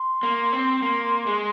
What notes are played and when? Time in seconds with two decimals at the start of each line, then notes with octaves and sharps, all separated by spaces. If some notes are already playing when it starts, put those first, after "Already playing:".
Already playing: C6
0.23 A#3
0.53 C4
0.82 A#3
1.26 G#3